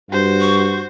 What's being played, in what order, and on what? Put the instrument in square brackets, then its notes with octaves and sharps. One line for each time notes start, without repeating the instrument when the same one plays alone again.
[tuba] G2 [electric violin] F#4 C5
[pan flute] C#6